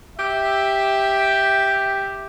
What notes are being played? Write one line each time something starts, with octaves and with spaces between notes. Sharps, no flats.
G4 E5